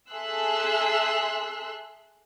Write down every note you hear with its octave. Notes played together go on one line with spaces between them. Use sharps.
G#4 A4 E5 C6 E6 F#6